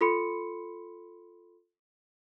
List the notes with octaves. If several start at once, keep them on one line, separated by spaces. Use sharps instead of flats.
F4 A4 B5 C6 C#7